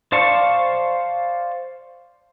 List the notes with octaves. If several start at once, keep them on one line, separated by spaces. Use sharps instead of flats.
C5 D5 F5 A5 C#6